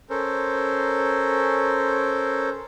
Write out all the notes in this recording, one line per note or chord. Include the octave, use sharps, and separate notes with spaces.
C#4 A4 A#4 C5